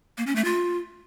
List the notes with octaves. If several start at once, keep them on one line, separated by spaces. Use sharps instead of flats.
A#3
C#4
A3
F4